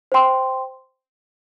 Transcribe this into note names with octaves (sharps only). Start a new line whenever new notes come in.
C5 G5 C6